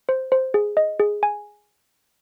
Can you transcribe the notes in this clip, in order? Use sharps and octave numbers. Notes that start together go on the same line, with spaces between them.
C5
C5
G#4
D#5
G#4
G#5